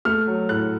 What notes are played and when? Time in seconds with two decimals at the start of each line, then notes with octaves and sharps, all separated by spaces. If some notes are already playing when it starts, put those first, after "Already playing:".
0.05 A3 F6
0.27 F#3
0.49 A2 F#6